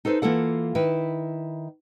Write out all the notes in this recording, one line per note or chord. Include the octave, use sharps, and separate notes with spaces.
D#4 A4 B4 C5
E3 A#3 F4 A4 F#5
D#3 E4 B4